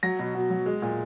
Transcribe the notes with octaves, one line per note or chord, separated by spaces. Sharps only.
F#3 A#6
B2
B2
F#3
G#3
A#2